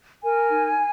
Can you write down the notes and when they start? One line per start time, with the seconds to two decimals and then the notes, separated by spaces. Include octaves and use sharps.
0.23 A#4 G#5
0.51 D#4